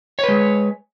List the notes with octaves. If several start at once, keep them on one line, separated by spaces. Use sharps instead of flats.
G#3 B4 C#5